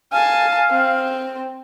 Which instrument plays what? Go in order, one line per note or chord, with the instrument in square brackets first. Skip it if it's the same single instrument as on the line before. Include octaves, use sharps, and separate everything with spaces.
[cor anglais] F5 [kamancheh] G#5 A5
[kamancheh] C4